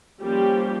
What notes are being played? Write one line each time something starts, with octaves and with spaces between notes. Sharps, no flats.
F3 G3 A#3 C#4 G4